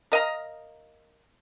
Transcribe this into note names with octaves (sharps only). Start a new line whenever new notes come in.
A#4 D#5 F5 A#5